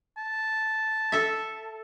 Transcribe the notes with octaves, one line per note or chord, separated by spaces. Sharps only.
A5
A4 E5